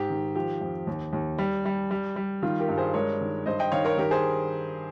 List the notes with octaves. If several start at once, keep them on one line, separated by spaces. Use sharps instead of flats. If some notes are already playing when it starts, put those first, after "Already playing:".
Already playing: G#2 G4
D#3
F3 G4
F2
D#2
D#2
G3
G3
G3
G3
D#3 F4
G4 A#4
G2
G#4 C5
G#3 A#4 C#5
D#3
G2 C5 D#5
D#5 G5
D#3 C#5 F5
A#4 C#5
D#3 G4 A#4
G#4 C5